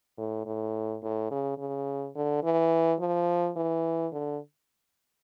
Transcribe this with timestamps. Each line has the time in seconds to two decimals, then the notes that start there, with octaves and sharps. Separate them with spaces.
0.17 A2
0.46 A2
1.03 A2
1.31 C#3
1.58 C#3
2.16 D3
2.43 E3
3.00 F3
3.56 E3
4.12 D3